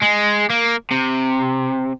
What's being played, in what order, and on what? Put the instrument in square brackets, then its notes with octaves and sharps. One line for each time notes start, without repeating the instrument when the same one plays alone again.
[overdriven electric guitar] G#3
A#3
C3